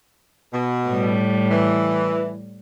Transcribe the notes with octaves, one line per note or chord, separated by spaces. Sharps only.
B2
A2 G3
E3